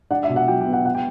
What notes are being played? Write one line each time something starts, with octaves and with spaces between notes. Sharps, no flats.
D4 F#5
E5
B2
F#5
F#3 G5
G5
B3
F#5
F#5
G5